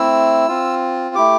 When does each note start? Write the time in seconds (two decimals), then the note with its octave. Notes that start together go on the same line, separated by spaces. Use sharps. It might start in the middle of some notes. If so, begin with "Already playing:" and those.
Already playing: A3 C4 E4 E6
0.48 C4 F4
1.15 A3 E4 G4 D6